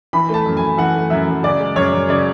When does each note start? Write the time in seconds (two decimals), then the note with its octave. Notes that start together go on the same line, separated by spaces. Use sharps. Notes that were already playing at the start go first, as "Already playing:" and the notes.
0.13 E3 B5
0.29 A3
0.34 A5
0.46 F#2
0.57 F#2 G#5
0.78 E3 F#5
0.94 A3
1.10 F#2 E5
1.28 F#2
1.43 C#3 D5
1.60 G#3
1.76 F#2 C#5
1.93 F#2
2.09 C#3 D5